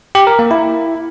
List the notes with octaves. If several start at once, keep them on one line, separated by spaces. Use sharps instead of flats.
G4
A#4
A#3
E4